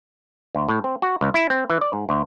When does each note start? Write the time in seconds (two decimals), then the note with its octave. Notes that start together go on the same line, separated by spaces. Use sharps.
0.55 D2
0.69 A2
0.84 C4
1.02 F#4
1.21 C#2
1.34 E4
1.50 C4
1.70 E3
1.81 D5
1.93 G#2
2.09 D2